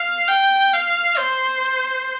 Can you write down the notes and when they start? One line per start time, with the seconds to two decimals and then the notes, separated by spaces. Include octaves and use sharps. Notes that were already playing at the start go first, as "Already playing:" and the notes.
Already playing: F5
0.29 G5
0.74 F5
1.18 C5